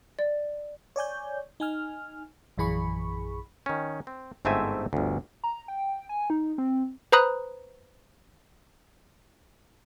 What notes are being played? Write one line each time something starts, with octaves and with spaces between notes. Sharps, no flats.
D5
C#5 D5 G#5 G6
D#4 G#5 F6
A#1 F#2 E3 G#4 B5 C#6
D#3 C#4
C4
G1 G#2 A3 C4 E5 G#5
G1 D2
A#5
G5
G#5
D#4
C4
B4 C5 A#5 B5 D#6 F#6